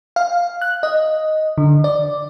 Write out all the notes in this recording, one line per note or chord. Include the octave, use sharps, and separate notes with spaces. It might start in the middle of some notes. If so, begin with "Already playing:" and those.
F5
F#6
D#5
D3
D5